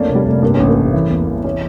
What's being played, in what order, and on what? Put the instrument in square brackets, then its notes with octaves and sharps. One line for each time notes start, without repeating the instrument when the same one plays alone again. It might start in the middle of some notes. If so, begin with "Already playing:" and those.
Already playing: [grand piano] F2 [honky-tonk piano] A3 A#3 C#4 D4
[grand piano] F1
[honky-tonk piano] G3
[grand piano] F1 [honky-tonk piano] A3
[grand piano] G2 [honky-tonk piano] A#3
[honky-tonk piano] C#4
[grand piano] A1
[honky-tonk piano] A#3
[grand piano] A3
E3
E2
E2
[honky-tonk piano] C#4